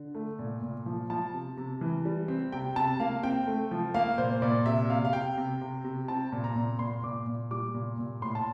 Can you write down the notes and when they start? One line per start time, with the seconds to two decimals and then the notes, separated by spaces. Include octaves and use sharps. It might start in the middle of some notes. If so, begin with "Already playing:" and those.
Already playing: D3
0.15 A3
0.39 A#2
0.63 A#2
0.86 F3
1.10 F3 A5
1.34 C3
1.57 C3
1.81 E3
2.05 G3
2.28 C4
2.52 C3 G5
2.76 C3 A5
3.00 A#3 F5
3.23 C4 G5
3.47 A3
3.71 F3
3.94 A#3 F5
4.18 A#2 C5
4.42 A#2 D5
4.66 C3 E5
4.90 C3 F5
5.05 F5
5.13 C3 G5
5.37 C3
5.61 C3
5.85 C3
6.08 C4 A5
6.32 A#2
6.44 A#5
6.56 A#2
6.79 A#2 C6
7.04 A#2 D6
7.27 A#2
7.51 G3 D6
7.74 A#2
7.98 A#2
8.22 A2 C6
8.35 A5